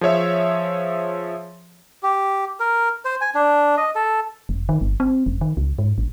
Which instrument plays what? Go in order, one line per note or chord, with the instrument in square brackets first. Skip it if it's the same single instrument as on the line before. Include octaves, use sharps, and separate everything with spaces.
[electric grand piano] F3 G#4 C#5 E5
[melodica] G4
A#4
C5
G#5
D4
D#5
A4
[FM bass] F1
D#3
G1
C4
F1
D#3
C#2
G#2
A1